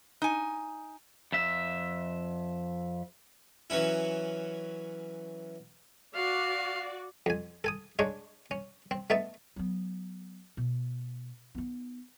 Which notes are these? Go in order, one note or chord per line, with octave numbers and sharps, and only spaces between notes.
D#4 G#5
F2 E5
E3 F#3 C#4 E4
F#4 D5 F5
F2 G#5
A4 G#5 D#6
G#3 D4 D#4 C#5
C#4
C4
A3 B3 D#4 E5 A5
F#3 B3
B2
B3 D#4